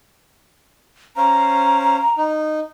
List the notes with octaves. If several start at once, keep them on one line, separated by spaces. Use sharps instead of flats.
C#4 C5 F5 A#5
D#4